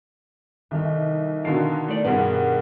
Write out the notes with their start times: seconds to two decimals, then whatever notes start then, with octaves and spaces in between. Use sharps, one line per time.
0.71 C2 D#3 A4 F6
1.45 B2 D3 D#3 E4 F5 A5 A#5 C6
1.88 A3 D5
2.05 G2 B2 B3 G#4 A#4